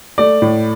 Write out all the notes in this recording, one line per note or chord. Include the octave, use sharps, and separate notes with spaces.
A3 D5
A2